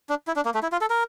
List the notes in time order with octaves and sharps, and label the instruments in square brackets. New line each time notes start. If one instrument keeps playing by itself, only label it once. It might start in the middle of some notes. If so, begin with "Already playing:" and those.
[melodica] D4
E4
D4
A#3
A3
E4
F4
A4
A#4